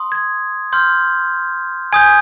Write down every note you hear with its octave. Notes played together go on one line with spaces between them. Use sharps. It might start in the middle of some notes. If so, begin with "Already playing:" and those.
Already playing: C6 D#6
G#6
C6 F6 G6
G#5 D#6 G6 G#6